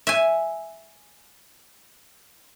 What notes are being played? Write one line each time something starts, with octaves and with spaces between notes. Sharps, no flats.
E5 G#5